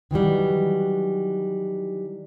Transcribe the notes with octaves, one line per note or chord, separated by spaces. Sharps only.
D#3 E3 F#3 G3